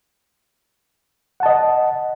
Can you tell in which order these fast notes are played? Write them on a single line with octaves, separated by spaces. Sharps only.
F#5 A5 D#5